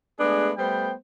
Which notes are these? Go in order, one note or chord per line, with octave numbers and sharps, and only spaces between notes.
G#3 A3 B3 D4 G#4
G3 A3 B3 C5 G5